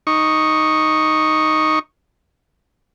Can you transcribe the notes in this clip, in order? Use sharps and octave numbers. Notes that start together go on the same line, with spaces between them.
D#4 C#6